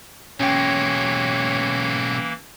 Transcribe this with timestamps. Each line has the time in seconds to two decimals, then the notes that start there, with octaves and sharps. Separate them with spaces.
0.40 B1 E3 G#3 A#3 C#4 C#5 G5